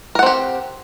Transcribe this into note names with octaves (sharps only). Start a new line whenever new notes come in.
C4 G4 A#4 F#5